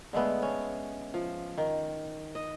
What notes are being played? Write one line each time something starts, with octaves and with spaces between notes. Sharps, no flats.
D3 G#3 A3 B3
C#4
F3
D#3
D#5